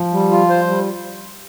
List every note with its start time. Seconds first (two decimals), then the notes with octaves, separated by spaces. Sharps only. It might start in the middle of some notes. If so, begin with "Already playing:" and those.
Already playing: F3
0.12 G3
0.31 F4
0.49 C5
0.67 G3